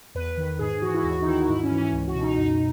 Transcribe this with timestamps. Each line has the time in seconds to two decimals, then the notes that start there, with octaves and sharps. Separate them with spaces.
0.15 E2 B4
0.38 D#3
0.59 G#2 G#4
0.82 E3 F#4
0.94 E4
1.04 D#2 F#4
1.22 D#4
1.26 D#3 E4
1.43 F#4
1.49 G#2 E4
1.63 C#4
1.71 E3
1.78 C#4
1.93 C#2
2.08 F#4
2.15 B2
2.23 D#4
2.37 F#2 D#4